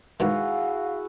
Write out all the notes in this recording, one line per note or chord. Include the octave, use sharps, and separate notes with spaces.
G#2 B2 D#3 E4 F#4 G#4 F5